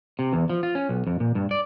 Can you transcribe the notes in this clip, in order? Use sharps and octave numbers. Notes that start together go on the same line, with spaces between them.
C3
E2
F3
F4
C#4
B1
F2
A#2
G2
D5